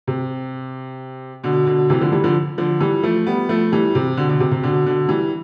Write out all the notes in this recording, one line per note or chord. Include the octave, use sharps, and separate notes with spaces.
C3
B2 D3
B2 D3
C3 E3
D3 F3
E3 G3
D3 F3
D3 F3
E3 G3
F3 A3
G3 B3
F3 A3
E3 G3
C3
B2 D3
B2 D3
C3
C3
B2 D3
B2 D3
E3 G3